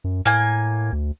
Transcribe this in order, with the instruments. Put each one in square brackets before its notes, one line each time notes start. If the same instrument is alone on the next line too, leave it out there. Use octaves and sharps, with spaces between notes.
[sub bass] F#2
[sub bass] A2 [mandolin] A#3 G#5
[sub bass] D2